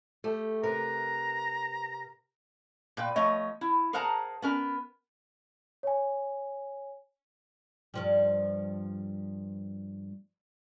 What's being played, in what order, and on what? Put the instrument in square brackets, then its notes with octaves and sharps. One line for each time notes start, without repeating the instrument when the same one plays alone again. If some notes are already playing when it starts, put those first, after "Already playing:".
[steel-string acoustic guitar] A3 G4
[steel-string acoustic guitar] C3 A#4 B4 [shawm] A#5
[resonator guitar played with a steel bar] A#2 B4 G5
F3 A3 C#5 D#5
E4
G#4 A#4 C5 F#5 A5 A#5
B3 C#4 A#4
[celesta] C#5 G#5
[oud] G2 F3 G3